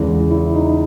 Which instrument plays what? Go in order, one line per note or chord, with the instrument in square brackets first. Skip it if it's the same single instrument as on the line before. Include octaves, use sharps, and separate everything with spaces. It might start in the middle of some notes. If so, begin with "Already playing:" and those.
Already playing: [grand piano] E2 C#3 E3 G#3
[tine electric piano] E4
D#4